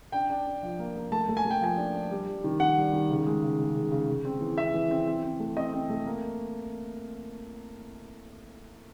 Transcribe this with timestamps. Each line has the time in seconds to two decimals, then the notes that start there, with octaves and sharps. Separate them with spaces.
0.12 D4 G5
0.30 D4
0.46 D4
0.62 F3
0.79 A#3
0.96 A#3
1.12 A3 A5
1.28 A3
1.37 G#5
1.45 A3
1.50 G5
1.61 F3 G#5
1.77 D4
1.94 D4
2.11 G3
2.27 G3
2.44 D#3
2.60 D#3 F#5
2.77 G3
2.93 D#3
3.10 C#3
3.26 G#3
3.43 C#3
3.59 C#3
3.76 C#3
3.91 C#3
4.08 C#3
4.25 C4
4.41 E3
4.57 C4 E5
4.74 E3
4.91 C4
5.07 C4
5.23 C4
5.40 A3
5.56 C4 D#5
5.73 C4
5.89 A3
6.06 A#3